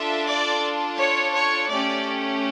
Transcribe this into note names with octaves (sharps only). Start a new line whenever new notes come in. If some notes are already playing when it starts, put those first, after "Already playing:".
Already playing: D4 F4 A4 E5
D5
C#5
C#5
A3 C#4 G4 D5